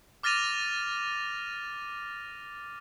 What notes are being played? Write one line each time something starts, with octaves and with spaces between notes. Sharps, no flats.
D6 F6 A6 A#6 D#7 F7